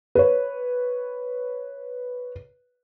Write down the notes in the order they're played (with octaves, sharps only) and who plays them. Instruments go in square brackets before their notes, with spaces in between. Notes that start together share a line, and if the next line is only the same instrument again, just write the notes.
[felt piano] B4 C#5